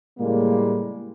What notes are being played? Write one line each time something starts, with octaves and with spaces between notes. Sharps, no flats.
A2 C#3 G3 G#3 A#3